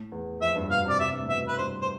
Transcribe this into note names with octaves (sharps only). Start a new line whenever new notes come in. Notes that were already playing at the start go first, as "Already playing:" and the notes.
Already playing: A2
E2
F2 E5
G2
B2 F5
C3 D5
C3 E5
G2
A2
B2 E5
B4
G2 C5
C5